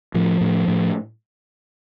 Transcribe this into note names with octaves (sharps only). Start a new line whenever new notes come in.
A2 F3
A2
A2